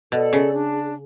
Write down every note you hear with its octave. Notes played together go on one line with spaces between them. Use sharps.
B2 A4 D5
C#3
D4